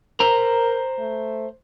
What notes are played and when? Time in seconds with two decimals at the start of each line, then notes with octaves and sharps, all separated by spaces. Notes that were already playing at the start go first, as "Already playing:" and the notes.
0.20 A#4 C5 A#5
0.99 A3